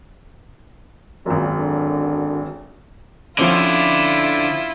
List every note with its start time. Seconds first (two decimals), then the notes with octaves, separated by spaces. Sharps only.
1.26 G#1 F#2 A#2
1.58 D3
3.38 D3 F3 C4 C#4 E4 F4